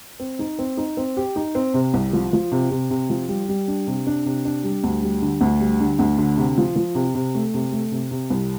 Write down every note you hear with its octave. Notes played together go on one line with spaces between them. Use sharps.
C4
D#4
C4
D#4
C4
G4
D#4
C4
C3
C2
F3
F3
C3
C3
C3
F3
G3
G3
D4
C3
D4
C3
D4
G3
D2
G3
D3
D2
G3
D3
D2
D3
C3
F3
F3
C3
C3
A3
C3
A3
C3
C3
C2